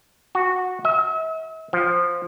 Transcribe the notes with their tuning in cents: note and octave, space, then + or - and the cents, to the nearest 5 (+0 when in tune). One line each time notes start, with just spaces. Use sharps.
F#4 -10
E5 -45
F3 +0